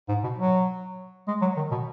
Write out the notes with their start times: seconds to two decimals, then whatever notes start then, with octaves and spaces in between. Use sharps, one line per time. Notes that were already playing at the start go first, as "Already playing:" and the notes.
0.09 G#2
0.24 B2
0.39 F#3
1.28 G#3
1.42 F#3
1.57 D#3
1.71 B2